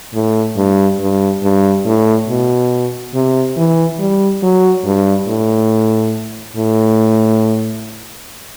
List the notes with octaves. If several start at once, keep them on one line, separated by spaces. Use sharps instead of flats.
A2
G2
G2
G2
A2
B2
C3
E3
G3
F#3
G2
A2
A2